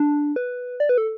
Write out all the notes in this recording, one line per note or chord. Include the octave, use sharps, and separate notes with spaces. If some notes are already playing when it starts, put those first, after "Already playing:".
Already playing: D4
B4
D5
B4
A4